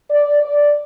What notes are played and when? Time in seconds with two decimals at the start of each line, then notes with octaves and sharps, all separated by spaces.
0.10 D5
0.42 D5